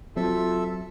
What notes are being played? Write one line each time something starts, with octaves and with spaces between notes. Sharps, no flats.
F#3 C4 F4 A4 E5